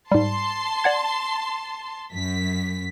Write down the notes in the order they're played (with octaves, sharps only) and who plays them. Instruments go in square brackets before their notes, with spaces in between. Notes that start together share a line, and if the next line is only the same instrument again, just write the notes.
[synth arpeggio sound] G#2 G3 [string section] A5 C6
[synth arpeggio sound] D5 F#5 G#6
[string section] F#2 B6